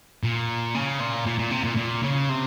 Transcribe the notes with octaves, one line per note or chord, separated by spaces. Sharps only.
A#2
C#3
A#2
A#2
A#2
C3
A#2
A#2
C#3
C3